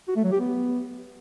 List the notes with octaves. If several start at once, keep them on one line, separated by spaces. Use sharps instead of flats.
F#4
A3
F#3
G4
B3